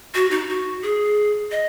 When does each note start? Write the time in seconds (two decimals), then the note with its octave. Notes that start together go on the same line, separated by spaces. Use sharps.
0.15 F#4
0.31 D#4
0.49 F#4
0.83 G#4
1.52 D#5